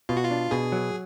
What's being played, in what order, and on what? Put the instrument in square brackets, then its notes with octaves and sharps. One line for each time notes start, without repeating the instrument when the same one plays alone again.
[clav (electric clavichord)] B2 [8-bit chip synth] F4
[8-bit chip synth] F#4
F4
[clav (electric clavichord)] D4
[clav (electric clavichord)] B2 [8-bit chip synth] G#4
[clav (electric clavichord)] F#3